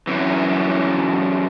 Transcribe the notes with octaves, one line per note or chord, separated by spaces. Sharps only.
F#2 E3